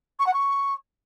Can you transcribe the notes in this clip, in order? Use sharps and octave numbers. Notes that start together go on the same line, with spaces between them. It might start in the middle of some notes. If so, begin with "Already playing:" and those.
C#6
F#5
C#6